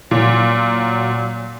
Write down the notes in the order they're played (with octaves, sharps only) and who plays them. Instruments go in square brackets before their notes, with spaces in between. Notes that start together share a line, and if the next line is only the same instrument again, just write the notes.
[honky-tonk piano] A#2 [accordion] F#3